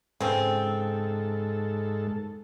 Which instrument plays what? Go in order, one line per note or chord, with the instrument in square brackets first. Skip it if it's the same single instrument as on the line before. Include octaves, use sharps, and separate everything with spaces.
[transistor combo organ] G#2 A4 [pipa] C#3 C4